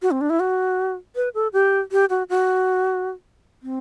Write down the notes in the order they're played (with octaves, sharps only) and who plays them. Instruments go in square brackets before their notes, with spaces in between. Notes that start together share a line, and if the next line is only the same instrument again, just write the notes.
[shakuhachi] F#4
C4
D4
E4
F#4
B4
A4
G4
G4
F#4
F#4
C4